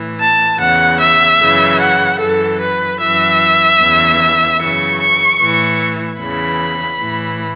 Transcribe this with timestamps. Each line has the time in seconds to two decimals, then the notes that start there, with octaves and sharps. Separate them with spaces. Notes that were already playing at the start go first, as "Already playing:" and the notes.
Already playing: A2 E3
0.20 A5
0.60 E2 C#3 E3 F#5
1.00 E5
1.40 F#2 C#3 E3
1.80 F#5
2.20 F#2 E3 A4
2.60 B4
3.00 F#2 E3 E5
3.80 E2 C#3 E3
4.60 F#2 C#3 E3 C#6
5.00 C#6
5.39 A2 E3
6.20 E2 C#3 E3 B5
7.00 A2 E3